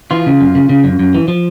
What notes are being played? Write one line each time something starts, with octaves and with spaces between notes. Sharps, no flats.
E3 F4
C#3
F#2
C#3
C#3
F#2
F#2
E3
F3